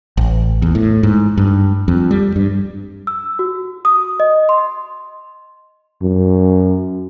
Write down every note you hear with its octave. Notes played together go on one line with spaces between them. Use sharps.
A1
E2
A2
G#2
G2
F2
G3
G2
E6
F#4
D#6
D#5
C6
F#2